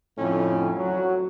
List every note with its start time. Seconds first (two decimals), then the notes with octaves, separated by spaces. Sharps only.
0.18 F2 A2 D3 A3 C#4
0.76 F#3